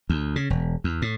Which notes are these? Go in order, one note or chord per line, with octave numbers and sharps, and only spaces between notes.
D2
C#3
E1
E2
A2